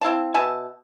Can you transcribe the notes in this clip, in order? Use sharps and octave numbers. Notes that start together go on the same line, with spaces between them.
C4 E4 F5 A5
B2 E5 G#5 A5